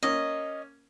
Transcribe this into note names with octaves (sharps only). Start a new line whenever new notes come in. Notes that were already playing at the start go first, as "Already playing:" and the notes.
A#3 C#4 D#5